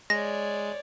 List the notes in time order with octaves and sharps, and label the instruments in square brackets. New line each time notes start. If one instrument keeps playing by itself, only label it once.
[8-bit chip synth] G#3 [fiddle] C#5 D5 [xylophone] A#6